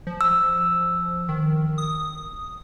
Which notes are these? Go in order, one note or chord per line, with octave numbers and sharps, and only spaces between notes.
F3
E6
D#3
D#6